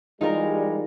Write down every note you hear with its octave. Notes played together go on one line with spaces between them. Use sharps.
E3 G3 G#3 D#4 F4 A#4